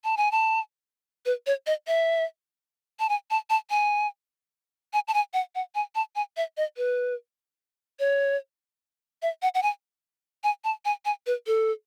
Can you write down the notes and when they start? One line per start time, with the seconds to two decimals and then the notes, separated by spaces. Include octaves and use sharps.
0.04 A5
0.17 G#5
0.32 A5
1.26 B4
1.47 C#5
1.67 D#5
1.87 E5
2.99 A5
3.09 G#5
3.31 A5
3.50 A5
3.70 G#5
4.93 G#5
5.08 A5
5.14 G#5
5.34 F#5
5.55 F#5
5.75 G#5
5.95 A5
6.16 G#5
6.37 E5
6.57 D#5
6.77 B4
7.99 C#5
9.22 E5
9.42 F#5
9.55 F#5
9.63 G#5
10.44 G#5
10.64 A5
10.85 G#5
11.05 G#5
11.26 B4
11.47 A4